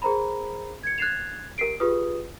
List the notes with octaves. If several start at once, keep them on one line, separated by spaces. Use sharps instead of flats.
G#4 A#4 C5 A#5 B5
G#6 C#7
F#6 G#6 A6 C7 E7 F7
G4 A#4 B6 C7 D7
F4 G4 G#4 B4 D#6